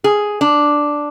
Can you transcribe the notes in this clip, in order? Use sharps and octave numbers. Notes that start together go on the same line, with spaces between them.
G#4
D4